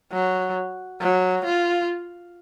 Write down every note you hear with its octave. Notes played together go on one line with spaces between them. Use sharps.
F#3
F#3
F4